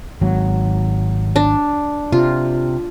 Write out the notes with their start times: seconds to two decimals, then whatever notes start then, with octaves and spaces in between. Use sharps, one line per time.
0.21 G#1 F#3
1.36 D4
2.12 C3 F4